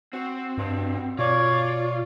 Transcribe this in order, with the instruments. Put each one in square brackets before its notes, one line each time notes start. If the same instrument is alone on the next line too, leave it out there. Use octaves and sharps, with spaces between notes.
[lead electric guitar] C4 [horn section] F#4
[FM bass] G2 [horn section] B2 G3 B3
[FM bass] B2 [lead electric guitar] F4 [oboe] C#5 [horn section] D5